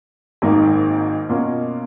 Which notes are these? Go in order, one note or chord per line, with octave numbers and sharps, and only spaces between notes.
G#1 G#2 D#3 A#3 D#4
B2 A#3 C#4 F4